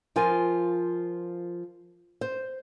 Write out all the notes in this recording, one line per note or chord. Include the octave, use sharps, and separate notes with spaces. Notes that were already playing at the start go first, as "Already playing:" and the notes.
F3 F4 A#4 G#5
C5